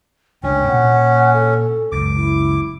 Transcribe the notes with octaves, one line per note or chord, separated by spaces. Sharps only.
G1 C#2 C#4 D4 G5
A#2 F#5
A4
F#1 C#2 F#2 D6
E4